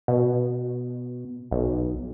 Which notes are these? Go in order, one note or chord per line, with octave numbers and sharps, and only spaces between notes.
B2
B1